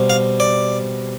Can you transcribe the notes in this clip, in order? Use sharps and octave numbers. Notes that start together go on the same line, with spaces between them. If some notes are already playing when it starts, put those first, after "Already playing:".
Already playing: B2 G3 C4
F5
D5